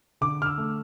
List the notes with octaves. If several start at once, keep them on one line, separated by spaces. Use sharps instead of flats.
D3 D6
F6
E6
A3